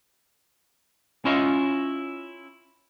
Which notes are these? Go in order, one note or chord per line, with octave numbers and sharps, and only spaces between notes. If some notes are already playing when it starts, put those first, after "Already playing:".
C#4 E4 F4 C#5 D#5 F5